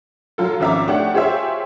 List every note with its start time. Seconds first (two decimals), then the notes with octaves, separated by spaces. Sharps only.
0.38 F#3 F4 A4
0.60 G#1 F3 C#4 E5 A#5 D6
0.87 A3 D4 G4 C#5 F#5
1.14 F4 G4 G#4 C5 C#5 E5